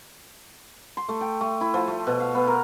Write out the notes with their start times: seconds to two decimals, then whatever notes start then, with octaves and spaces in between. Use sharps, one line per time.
0.97 C6
1.09 A3
1.21 G5
1.41 A3
1.61 E4
1.74 F3
1.88 A3
2.07 B2
2.20 F5
2.35 B3
2.47 A#4